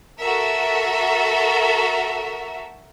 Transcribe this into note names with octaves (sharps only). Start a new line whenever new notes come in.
F#4 A4 A#4 E5